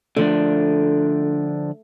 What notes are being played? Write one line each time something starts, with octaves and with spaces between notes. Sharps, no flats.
D3 F3 A3 D4